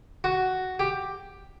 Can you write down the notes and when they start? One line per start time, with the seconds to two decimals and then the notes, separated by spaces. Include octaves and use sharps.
0.24 F#4
0.80 G4